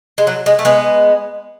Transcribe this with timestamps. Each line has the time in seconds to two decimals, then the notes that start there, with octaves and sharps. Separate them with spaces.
0.18 G#3
0.27 F#3
0.46 G#3
0.59 A3
0.65 G#3 B3